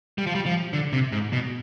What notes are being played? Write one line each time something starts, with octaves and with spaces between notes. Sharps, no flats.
G3
F3
G3
F3
D3
C3
G#2
B2